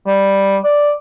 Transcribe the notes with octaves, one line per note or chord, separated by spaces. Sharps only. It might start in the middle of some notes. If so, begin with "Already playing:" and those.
G3
D5